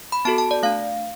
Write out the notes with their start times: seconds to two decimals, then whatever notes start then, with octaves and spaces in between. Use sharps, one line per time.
0.12 B5
0.25 B3 F#4 A4 A5
0.38 A5
0.51 D5
0.63 A3 D4 F5